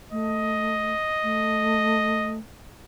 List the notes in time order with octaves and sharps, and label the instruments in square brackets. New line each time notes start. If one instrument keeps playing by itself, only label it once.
[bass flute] A3 [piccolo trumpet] D#5
[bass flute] A3